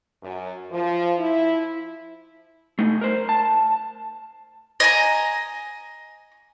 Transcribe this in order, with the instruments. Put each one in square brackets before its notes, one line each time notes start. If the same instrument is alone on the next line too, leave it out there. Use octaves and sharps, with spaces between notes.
[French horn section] F#2
F3
E4
[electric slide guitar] A3 D#4
A#4 C5
A5
[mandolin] D#5 G#5 A#5